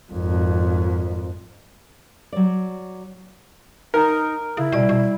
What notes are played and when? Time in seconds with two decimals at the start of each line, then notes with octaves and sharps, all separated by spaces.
0.12 G#1 F2
2.33 F#3 D5
3.94 D#4 A#4
4.57 C#3 E4
4.72 B2 G3 D5
4.89 B2